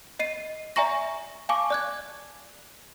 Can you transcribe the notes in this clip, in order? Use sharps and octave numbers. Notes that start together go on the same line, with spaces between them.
D#5 C7 D#7
D5 E5 G#5 A#5 C#6 A#6
F5 G#5 A5 C#6 D6
D5 F#6 G#6